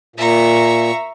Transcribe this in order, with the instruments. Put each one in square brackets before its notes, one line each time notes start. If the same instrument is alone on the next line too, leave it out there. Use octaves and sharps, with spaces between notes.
[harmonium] A#2 [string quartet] E5 A#5 C#6